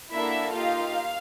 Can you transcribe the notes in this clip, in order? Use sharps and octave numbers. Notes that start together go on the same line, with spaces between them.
A#3 D4 E4 F#4 A4 E5
A#3 D#4 F4 G4 F5